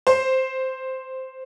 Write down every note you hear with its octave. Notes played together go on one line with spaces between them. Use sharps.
C5